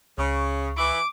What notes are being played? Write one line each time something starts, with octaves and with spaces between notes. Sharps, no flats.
C#2 C#3 C#6
E3 E4 D6